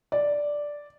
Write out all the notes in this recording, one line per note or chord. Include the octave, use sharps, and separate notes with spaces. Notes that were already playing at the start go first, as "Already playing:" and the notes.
D5